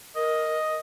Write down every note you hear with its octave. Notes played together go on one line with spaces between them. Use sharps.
A#4 D#5